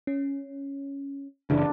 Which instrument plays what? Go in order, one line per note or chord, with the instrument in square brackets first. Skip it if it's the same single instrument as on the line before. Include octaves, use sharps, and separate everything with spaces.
[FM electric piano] C#4
[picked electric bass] F#1 C#3 E3 [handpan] D4